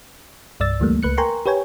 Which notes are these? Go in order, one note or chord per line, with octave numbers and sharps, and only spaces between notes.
C2 G2 D5 E6 A6
D2 E3 G3 A3 A#3
C#2 B4 F#6 C#7
A#4 G5 G#5 A#5 C6 C#6
G4 B4 C#5 G5 G#5